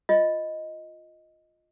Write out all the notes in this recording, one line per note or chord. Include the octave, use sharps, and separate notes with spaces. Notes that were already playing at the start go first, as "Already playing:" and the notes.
F4 D#5